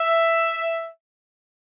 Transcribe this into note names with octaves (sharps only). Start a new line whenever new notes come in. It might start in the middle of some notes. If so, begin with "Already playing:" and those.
Already playing: E5